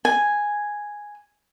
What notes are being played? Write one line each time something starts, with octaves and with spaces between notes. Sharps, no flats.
G#5